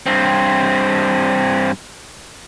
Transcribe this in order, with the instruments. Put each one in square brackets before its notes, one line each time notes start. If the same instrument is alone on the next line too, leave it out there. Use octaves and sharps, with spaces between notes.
[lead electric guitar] G2 C4